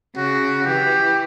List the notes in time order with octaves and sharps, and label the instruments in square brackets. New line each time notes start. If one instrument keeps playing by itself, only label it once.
[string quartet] C#3 [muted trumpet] F#4
[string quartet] E3 [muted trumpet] G4